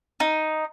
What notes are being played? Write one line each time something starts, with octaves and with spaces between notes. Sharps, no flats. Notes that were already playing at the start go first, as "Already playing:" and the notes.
D#4